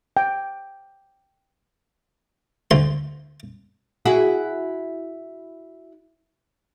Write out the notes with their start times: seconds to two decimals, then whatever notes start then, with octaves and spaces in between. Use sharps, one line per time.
0.17 G5
2.71 D2 C6
4.05 E4 F#4 G#4